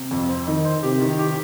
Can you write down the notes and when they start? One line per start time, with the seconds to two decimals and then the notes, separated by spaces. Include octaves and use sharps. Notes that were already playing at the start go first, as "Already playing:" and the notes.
Already playing: C3
0.11 F2
0.28 C5
0.47 D#3 D#4
0.65 C5
0.83 C3 G4
1.01 D#3
1.19 G4